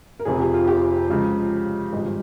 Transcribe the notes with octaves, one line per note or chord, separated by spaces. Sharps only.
A#4
F1 F2 C3 F3 G#4
G4
F4
G4
C#2 C#3 F3 G#3
G#1 G2 F3 G#3